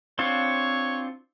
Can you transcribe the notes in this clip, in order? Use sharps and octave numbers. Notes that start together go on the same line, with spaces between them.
C4 D4 F4 C#5